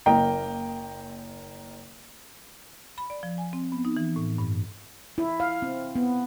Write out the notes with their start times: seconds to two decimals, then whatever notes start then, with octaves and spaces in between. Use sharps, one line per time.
0.06 F#1 A#3 D#5 G5 A#5
2.98 B5
3.10 D5
3.23 F3
3.38 G#5
3.53 C4
3.72 B3
3.85 D#4
3.97 E3
4.16 A2
4.38 G2
5.18 E4
5.40 F5
5.62 C4
5.96 B3